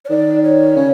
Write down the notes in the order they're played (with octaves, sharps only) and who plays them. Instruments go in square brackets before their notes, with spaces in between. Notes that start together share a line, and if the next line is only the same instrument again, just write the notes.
[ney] C#5
[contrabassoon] D#3 [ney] D5
[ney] C#5
[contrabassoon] C#3